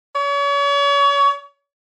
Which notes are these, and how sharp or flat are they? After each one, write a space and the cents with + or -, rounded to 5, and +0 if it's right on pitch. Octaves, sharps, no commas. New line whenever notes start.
C#5 +35